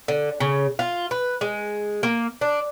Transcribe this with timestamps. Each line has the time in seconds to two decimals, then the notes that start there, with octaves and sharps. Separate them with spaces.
0.08 D3
0.40 C#3
0.79 F4
1.11 B4
1.41 G#3
2.03 A#3
2.41 D4